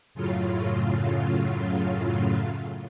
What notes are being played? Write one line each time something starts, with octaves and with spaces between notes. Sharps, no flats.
F#2 A2 C#3 F#3 F4